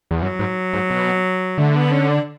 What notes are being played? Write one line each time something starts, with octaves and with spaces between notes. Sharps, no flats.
E2
F#2 F#3
G#2
G#2
B2
D3 A3
B3
C#4
D4